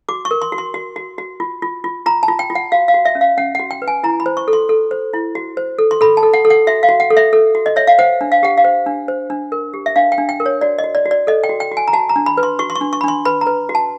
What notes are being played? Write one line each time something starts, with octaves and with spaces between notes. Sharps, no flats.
F#4 D6
C#6
A#4
C6
F#4
C6
F#4
F#4
F#4
F4
F4
F4
F4 A#5
A5
F4
G5
F4
F#5
F#4 F5
F5
F#4
E5
C#4
F5
C#4 F#5
F#4 F#5
G5
B4
G#5
E4 A#5
B5
C5
C#6
A4
C6
A4
C5
E4
F#4
C5
A4
C6
A4 B5
A5
A4
F#5
A4
F#5
F#4 E5
F5
F#4
F#5
A4
E5
A4
F#4
D#5
C#5 E5
F5
C5 F#5
D4
F5
G4 F#5
F5
C5
D4
C5
D4
A#4
G4
E5
D4 F5
G5
D4
G5
A#4
C#5
F#4 D5
D#5
F#4
D5
F#4
D5
A4 D#5
G5
F#4
G5
F#4
G#5
A#5
F#4 A5
A#5
D4
B5
B4
C6
F#4 C#6
C6
C#6
D4
C#6
B5
D4 C6
B4 B5
A#5
B4
F#4
A5